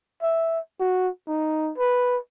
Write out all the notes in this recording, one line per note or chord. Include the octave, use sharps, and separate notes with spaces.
E5
F#4
D#4
B4